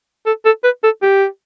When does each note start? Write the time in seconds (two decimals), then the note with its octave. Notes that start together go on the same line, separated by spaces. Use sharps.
0.26 A4
0.45 A4
0.63 B4
0.83 A4
1.02 G4